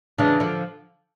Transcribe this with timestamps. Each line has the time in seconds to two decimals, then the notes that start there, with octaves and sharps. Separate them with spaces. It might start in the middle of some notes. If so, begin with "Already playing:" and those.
0.18 C#3 E3 D4
0.40 D3 F3